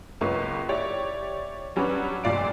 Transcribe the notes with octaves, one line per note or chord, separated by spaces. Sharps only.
C#2 F#2 A#3 B4 C#6
E4 G4 C#5 D5
F#3 G3 C#4 D4 B4 C#5
F1 C2 A#2 D5 F5 D7